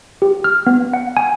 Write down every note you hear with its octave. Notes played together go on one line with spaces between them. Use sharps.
G4
F6
B3
F#5
G#5